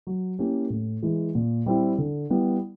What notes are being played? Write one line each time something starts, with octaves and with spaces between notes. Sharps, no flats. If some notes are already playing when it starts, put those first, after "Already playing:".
F#3
A#3 C#4 E4 G4
A2
E3 G#3
A#2
G3 C4 E4
D3
G3 B3 E4